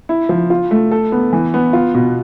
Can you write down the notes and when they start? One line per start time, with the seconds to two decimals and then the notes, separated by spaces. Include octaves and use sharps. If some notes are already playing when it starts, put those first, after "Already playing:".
0.09 E4
0.29 F3
0.50 F4
0.71 A3
0.91 A4
1.12 B3
1.33 E3
1.54 B3
1.73 F4
1.95 B2